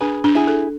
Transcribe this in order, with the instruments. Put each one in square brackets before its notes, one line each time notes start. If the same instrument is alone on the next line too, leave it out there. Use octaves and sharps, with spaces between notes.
[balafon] D4 [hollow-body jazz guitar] G#4 B4
[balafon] D4
[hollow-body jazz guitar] E4 G#4
[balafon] A4